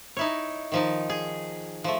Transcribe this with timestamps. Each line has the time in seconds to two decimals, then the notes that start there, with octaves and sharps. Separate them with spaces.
0.17 D#4 E4 C#5
0.72 D#3 F3 D#4
1.09 G#4
1.84 F3 A3